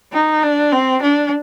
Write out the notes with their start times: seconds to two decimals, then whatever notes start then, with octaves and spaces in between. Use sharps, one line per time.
0.13 D#4
0.43 D4
0.72 C4
1.02 D4